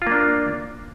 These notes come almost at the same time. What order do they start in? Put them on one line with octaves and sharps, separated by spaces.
F4 A#3 D4